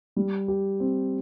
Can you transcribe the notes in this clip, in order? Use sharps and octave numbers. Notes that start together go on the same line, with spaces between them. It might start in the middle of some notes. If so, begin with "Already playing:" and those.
G3
G4
C4